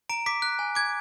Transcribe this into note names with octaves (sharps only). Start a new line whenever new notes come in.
A#5 D7
D6 B6
F#6
G#5
D6 G#6